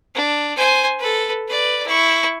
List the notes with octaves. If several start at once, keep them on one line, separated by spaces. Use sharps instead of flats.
D4
C5 G#5
A4 B4
B4 D5
E4 C#6